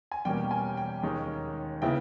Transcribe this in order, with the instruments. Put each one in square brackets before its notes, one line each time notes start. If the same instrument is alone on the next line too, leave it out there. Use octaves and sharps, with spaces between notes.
[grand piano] G#5
E2 B2 G3 A#3 C#4 G5
G#5
G5
D#2 D#3 G#3 C#4
C#3 G#3 B3 E4 G5